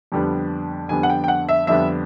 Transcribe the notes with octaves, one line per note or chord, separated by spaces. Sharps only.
F2 D3 G3 B3 D4
F2 D3 G3 B3 D4 G#5
F#5
G5
G5
F#5
E5
F2 D3 G3 B3 D4 E5